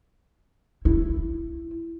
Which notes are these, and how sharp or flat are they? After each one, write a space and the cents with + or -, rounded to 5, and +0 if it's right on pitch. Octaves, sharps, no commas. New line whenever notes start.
E4 +15